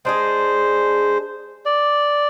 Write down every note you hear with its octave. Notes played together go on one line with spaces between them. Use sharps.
G#3 D4 G#4 C5
D5